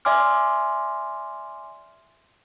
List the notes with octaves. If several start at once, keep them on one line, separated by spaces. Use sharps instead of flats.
D5 E5 G#5 C6 D6 F6